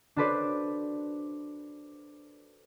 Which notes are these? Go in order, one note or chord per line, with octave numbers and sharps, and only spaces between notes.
D4 F#4 A4 B4 C5 D5